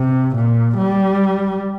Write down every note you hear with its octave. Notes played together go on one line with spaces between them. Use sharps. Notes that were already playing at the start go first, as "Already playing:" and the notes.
Already playing: C3
A#2
G3